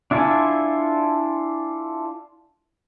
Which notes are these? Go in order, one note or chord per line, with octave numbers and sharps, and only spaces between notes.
D4 E4 F4 A4 G#5